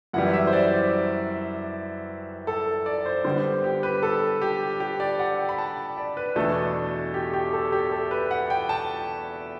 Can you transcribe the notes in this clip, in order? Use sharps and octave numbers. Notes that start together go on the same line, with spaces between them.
F#2 E3 G3 F#5
E5
C5
D5
A4
D5
C5
D3 G3 B3 C5
G4
B4
A4
G4
G4
D5
F#5
G5
B5
A5
D5
B4
E2 B2 A3 D4 A4
G4
G4
A4
G4
A4
B4
F#5
G5
A5